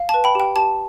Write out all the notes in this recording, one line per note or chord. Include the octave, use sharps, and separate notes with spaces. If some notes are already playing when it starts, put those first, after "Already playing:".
Already playing: F5
B4 A5
G5 B5
G4 G5
G4 A5